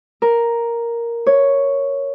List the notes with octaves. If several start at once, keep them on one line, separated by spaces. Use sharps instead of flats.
A#4
C#5